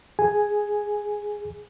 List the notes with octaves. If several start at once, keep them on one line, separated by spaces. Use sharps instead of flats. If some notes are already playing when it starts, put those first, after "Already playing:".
G#4 G#5